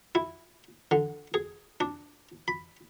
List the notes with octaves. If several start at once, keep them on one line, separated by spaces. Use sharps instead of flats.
E4
D3
G#4
D4
B5